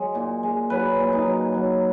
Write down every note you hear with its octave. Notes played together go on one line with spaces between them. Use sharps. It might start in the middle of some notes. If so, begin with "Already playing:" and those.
Already playing: F#3 G#3
A#2
G#3
F#3 B4
A#2
D#4
F#3
F#3